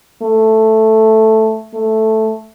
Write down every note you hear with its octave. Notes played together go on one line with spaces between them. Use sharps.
A3
A3